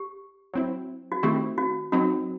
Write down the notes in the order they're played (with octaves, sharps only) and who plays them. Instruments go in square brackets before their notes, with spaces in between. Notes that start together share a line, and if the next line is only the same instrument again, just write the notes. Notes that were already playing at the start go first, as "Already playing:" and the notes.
Already playing: [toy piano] G4
[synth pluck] F#3 C4 E4
[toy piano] F#4
[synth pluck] D#3 A3 C4 E4 [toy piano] G4
[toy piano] F#4
[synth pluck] F#3 C4 D#4 [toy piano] F#4